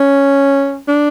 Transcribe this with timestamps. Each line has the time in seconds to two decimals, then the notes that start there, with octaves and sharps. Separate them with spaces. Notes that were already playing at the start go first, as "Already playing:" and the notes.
Already playing: C#4
0.88 D4